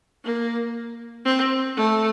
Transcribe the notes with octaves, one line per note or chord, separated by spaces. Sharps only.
A#3
C4
A3